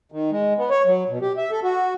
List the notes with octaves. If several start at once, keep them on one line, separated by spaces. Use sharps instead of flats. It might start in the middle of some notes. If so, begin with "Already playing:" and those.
D#3
G#3
B3
C#5
F#3
B2
G4
E5
A4
F#4